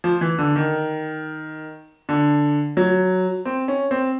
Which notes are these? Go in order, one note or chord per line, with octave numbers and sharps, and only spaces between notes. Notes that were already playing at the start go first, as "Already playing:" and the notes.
F3
E3
D3
D#3
D3
F#3
C4
C#4
C4